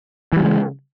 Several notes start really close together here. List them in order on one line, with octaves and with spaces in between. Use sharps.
E3 G3 C#3 G#3